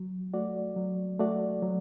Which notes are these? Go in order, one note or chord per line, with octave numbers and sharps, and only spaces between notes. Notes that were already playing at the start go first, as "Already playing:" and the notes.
Already playing: F#3
A3 F#4 D5
F#3
A3 F#4 D5
F#3